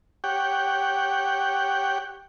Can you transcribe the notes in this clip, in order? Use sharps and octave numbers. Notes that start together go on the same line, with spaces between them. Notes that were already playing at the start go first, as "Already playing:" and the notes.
G4 C#5 F#5 G5